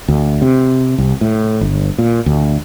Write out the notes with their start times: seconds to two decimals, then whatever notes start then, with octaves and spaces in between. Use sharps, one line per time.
0.08 D2
0.42 C3
0.98 C2
1.21 A2
1.61 G1
1.98 A#2
2.26 D2